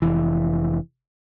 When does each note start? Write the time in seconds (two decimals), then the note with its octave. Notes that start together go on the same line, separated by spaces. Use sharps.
0.02 F1 E3